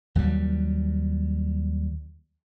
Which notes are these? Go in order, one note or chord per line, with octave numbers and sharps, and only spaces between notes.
D#2 F#3 G3